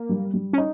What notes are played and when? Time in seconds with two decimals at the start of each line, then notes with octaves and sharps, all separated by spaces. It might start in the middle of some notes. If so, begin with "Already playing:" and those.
Already playing: A#3
0.09 G3
0.34 G3
0.53 C#4
0.58 D#4